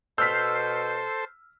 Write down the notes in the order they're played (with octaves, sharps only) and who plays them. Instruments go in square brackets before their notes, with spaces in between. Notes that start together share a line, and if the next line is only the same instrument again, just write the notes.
[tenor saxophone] B2 [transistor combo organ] A4 C5 [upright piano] E6 F6 B6 [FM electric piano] G6 C7